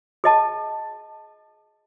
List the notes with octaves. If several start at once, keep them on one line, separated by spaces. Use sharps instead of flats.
G#4 D#5 A5